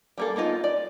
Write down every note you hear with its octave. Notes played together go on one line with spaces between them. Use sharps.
G3 A#3 A4
A#3 B3 D#4 F4
D5